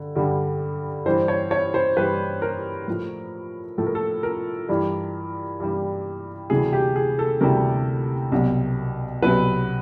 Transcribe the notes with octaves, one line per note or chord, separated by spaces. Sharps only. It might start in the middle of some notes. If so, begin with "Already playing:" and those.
Already playing: G2 D3
G2 D3 G3
G2 E3 G3 C5
C#5
C#5
C5
G2 E3 G3 B4
A#4
A2 F3
A2 F3 A4
A#4
A4
A#4
G2 E3 G3
G2 E3 G3
D2 C3 E3 G3 G#4
G4
G#4
A4
D2 C3 E3 G3 A#4
C2 B2 F#3
C2 B2 F#3 B4